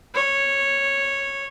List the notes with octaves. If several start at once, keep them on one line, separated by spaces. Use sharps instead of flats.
C#5